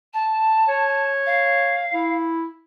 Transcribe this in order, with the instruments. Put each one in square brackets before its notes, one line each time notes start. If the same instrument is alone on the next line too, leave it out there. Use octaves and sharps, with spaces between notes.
[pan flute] A5
[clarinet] C#5
[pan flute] F5
[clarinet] E4